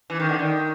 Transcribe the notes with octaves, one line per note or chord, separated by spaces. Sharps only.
E3
D#3
D3
D#3